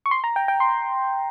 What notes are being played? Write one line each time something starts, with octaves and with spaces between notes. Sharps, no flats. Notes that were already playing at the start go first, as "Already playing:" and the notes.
C#6
C6
A#5
G5
G5
C6